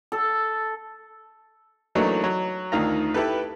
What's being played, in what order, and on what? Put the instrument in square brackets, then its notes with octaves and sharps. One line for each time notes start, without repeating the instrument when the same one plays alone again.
[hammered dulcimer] A4
[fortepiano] E3 F#3 A3 A#3 D4 D#4
F#3
D2 D#3 F4 A#5
E4 G4 A4 B4